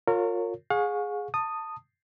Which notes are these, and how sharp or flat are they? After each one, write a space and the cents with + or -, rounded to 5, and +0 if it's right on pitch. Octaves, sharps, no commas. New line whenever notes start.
F4 +30 A#4 -30 C#5 +0
G#4 +0 F5 +45 C#6 +0
A5 +20 D#6 -10